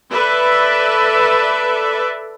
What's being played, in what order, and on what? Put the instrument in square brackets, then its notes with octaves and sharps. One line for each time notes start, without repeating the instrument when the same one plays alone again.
[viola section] A4 B4 D5 E5